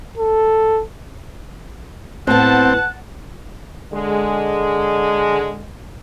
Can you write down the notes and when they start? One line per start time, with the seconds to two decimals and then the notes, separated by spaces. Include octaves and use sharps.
0.18 A4
2.27 A2 B3 C4 F#5 A5 F#6
3.93 D3 G#3